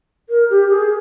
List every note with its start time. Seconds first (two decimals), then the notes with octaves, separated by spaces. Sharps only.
0.29 A#4
0.50 G4
0.70 G#4